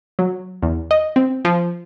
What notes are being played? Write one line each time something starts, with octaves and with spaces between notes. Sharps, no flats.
F#3
E2
D#5
C4
F3